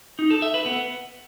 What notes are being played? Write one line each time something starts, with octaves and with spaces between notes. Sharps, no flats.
D#4
A4
E5
B4
B3